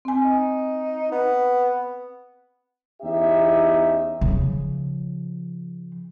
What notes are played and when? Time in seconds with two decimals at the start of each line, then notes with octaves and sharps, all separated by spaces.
0.05 C4 G#5
0.25 D#4
1.11 B3
3.02 E2 C#4 D#4 G4 E5
4.21 C#3 F3